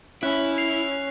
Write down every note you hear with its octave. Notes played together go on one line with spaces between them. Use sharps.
C#4 E4 F#6
C7 F7